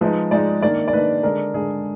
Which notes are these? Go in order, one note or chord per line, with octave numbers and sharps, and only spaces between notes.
F3 G#3 D#4 B4
F3 G#3 D#4 D5
D#3 A#3 D4 D5
D5
D#3 A#3 D4 B4
D3 G#3 D4 A#4
D3 G#3 D4 G#4